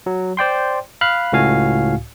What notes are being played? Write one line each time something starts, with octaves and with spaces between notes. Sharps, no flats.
F#3
C5 D5 G5 C6
F5 B5 F6 F#6
C#2 A2 F#4 F5 G#5